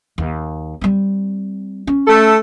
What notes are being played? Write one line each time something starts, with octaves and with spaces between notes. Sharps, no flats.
D#2
G3 C4
C#4
A3 A4